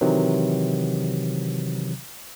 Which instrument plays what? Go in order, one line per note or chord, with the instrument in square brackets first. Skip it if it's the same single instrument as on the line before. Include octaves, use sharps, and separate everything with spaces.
[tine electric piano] C3 D#3 E3 F#3